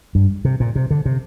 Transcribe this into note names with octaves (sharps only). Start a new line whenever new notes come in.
G2
C3
A#2
C3
D3
C3